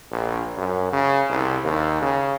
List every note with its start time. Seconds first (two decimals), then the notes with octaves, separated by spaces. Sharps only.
0.11 A#1
0.57 F#2
0.93 C#3
1.29 C2
1.64 D#2
2.02 C#3